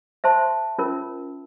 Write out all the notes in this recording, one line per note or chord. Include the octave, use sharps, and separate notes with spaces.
C5 E5 A5 C6
C#4 F4 A#4